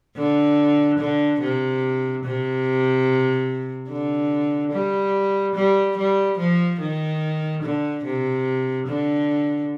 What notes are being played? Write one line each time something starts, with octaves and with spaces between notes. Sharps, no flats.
D3
D3
C3
C3
D3
G3
G3
G3
F3
D#3
D3
C3
D3